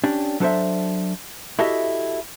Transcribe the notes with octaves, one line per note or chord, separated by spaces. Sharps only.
C#4 D4 G4
F#3 D4 A4 B4 C5 E5
E4 F#4 G4 A4 D#5 E5